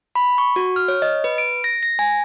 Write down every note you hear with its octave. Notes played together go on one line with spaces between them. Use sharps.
B5
C#6
F#4
F6
C#5
D#5
B4
D7
A#6
A#6
G#5